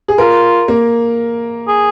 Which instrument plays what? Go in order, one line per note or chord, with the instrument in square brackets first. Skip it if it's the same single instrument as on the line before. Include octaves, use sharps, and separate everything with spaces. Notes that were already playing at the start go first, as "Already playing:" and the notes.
[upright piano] G#4
[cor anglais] F4 [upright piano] A#4
[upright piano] A#3
[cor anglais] G#4